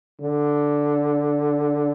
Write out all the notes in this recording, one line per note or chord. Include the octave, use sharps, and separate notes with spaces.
D3